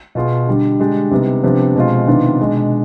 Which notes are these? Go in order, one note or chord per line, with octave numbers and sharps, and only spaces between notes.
B2 B3 F4 G#4
D3 G3 D4
D3 G#3 D4 G4
C3 G3 B3 D#4
C3 F3 B3 D4 G4
B2 G#3 C4 F4
C3 D#3 B3 D4 F4
B2 G#3 D4